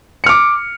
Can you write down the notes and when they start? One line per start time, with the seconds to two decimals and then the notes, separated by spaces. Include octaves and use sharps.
0.24 C#7
0.26 F6
0.29 D6